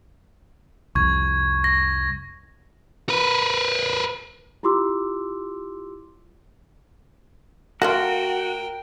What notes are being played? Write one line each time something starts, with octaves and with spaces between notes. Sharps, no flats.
C2 F2 C#6 G#6
A#6
A#4 B4
E4 F4 G4 C6 D6 E6
A3 A#3 F4 F#4 A#4 G5